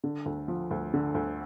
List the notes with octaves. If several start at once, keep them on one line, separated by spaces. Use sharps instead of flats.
D3
D2
F3
D2
D3
D2